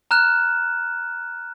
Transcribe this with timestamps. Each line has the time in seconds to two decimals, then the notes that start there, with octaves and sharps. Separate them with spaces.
0.11 A#5 F6 F#6 E7